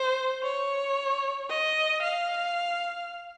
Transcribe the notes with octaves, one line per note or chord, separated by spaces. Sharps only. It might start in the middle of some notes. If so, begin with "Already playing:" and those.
Already playing: C5
C#5
D#5
F5